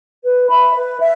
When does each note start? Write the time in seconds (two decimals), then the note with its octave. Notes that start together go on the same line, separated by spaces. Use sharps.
0.23 B4
0.49 E5 B5
0.73 B4
0.99 E5